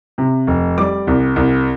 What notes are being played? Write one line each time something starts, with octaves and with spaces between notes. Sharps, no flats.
C3
F1
G3 D6
C2
C2